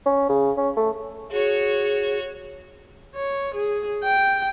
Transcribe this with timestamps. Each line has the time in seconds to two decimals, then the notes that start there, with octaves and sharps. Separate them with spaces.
0.06 C#4
0.29 C#3
0.57 C#4
0.77 A3
1.31 F#4 G#4 C#5
3.15 C#5
3.55 G#4
4.04 G5